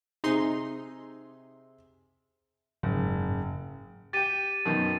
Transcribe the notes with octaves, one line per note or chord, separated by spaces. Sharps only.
C3 D#4 G#4 C6
F#1 G#2
G4 G5 A6 D#7
F#2 B2 D#3